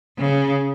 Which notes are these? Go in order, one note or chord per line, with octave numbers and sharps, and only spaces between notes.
C#3